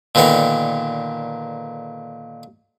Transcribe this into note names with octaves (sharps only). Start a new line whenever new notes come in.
A#2 D3 D#3 B3 D#4